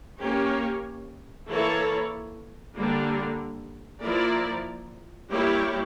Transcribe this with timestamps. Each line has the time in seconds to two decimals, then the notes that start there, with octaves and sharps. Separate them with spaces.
0.19 A#3 C#4 G4 C#5
1.46 E3 A#3 E4 A4 C#5
2.74 D3 G3 A#3 D4
4.02 F3 A#3 E4 A#4 D5
5.30 G3 A#3 E4 G4 C#5